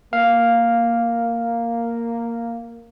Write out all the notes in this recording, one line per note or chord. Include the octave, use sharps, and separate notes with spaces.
A#3 F5